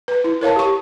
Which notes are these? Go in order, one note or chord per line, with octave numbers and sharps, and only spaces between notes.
B4
E4
A#4 C#5 F5 A5
G4 C#6